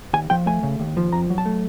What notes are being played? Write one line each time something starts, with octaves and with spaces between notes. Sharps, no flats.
D#2 G#5
F3 G5
A3 G#5
C#3
D#2
F3
F2 A#5
F#3
A5
A3